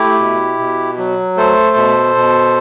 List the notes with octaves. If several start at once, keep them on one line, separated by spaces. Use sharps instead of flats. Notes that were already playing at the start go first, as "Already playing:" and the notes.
Already playing: A3 E4 G4
B2
B2
F#3
A3 A4 C5
B2
B2